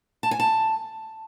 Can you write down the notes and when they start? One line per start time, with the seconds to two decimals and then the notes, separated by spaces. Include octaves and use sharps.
0.23 A5
0.31 G#5
0.40 A5